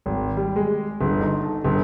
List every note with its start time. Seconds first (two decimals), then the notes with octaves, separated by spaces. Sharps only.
0.06 G#1
0.37 G3
0.56 G#3
1.01 G1
1.21 D#4
1.43 A4
1.65 G1